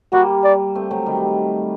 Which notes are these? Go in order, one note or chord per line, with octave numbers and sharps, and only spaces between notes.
G3 A#3 F#4
D5
A3 C4
F#3 A3
D#3 G3